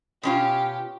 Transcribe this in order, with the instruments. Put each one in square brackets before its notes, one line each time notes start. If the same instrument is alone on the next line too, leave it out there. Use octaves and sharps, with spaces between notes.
[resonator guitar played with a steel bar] B2 C#4 F4 [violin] G4